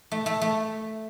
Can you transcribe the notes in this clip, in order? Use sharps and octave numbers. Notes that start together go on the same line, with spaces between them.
A3
A3
A3